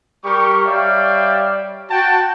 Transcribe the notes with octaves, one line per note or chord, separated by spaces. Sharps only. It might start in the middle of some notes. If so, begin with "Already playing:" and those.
G3 G4 A#4 C#6
G3 C#5 D5 E5 F5 G5
F#4 G5 A5